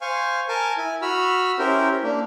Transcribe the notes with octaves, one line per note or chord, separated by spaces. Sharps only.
C5 F5 G#5 C#6
A#4 G#5 A5
E4 G#5
F#4 B5 E6 F6
C#4 E4 G4 A#4 C5
A#3 D4